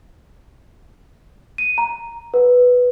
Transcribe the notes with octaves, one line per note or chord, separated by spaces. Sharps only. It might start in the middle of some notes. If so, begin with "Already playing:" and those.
D#7
A#5
B4